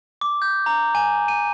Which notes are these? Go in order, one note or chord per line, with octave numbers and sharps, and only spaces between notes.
D6
G6
A#5
G#5
D#7